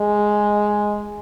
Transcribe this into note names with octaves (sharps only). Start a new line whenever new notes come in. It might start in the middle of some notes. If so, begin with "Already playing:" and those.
Already playing: G#3